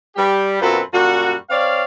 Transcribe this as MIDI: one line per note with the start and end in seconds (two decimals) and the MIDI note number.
0.16 0.58 55
0.16 0.58 67
0.60 0.80 42
0.60 0.80 47
0.60 0.80 60
0.60 0.80 65
0.60 0.80 69
0.60 0.80 71
0.93 1.34 42
0.93 1.34 46
0.93 1.34 55
0.93 1.34 66
1.49 1.82 60
1.49 1.82 73
1.49 1.82 74
1.49 1.82 77